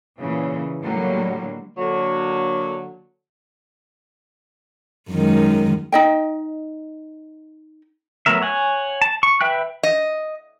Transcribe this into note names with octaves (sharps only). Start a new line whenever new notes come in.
A#2 C#3 E3
A2 D3 F#3 G3 A#3
D3 F#3 A#3
F#2 D#3 G#3
D#4 D#5 G5
F#3 A3 B3 A#4 E5
C#5 F#5 G#5
A5
C#6
B4 E5 G5 F#6
D#5